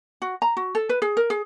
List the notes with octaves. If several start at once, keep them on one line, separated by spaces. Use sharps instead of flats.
F#4
A#5
F#4
A4
B4
G#4
A#4
G#4